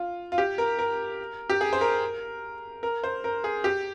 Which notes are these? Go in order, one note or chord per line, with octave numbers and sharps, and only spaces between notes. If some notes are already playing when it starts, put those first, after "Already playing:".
Already playing: F4
F4
G4
A#4
A#4
G4
G#4
C5
A#4
A#4
C5
A#4
G#4
G4